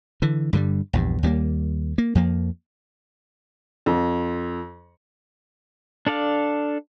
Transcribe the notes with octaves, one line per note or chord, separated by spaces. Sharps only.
D3 E3
G2 D3 D#3 G3
A#1 E2 G2
D#2 G3 G#3 A#3
A#3
F2 F3 A#3
F2
D4 A4 D5 F5